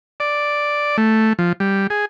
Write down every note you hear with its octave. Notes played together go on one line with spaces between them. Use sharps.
D5
A3
F3
G3
G#4